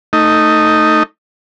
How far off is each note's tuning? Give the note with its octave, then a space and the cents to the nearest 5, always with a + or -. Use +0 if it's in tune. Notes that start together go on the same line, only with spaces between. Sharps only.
A3 +15 D#4 +0